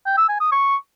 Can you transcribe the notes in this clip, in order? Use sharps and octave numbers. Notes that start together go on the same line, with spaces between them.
G5
E6
G#5
D#6
C#6